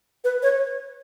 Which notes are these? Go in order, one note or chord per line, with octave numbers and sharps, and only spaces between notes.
B4
C#5